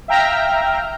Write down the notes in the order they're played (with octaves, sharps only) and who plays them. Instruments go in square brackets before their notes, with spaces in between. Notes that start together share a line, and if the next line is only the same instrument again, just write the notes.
[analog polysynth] E5 F5 G5 A#5 F6